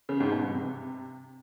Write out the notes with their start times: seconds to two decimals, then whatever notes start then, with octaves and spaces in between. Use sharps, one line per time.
0.09 C#3
0.20 G#2
0.32 B2
0.43 G2
0.55 C3